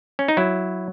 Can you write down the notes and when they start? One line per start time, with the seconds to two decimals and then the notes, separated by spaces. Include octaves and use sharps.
0.19 C#4
0.28 D#4
0.37 F#3 E4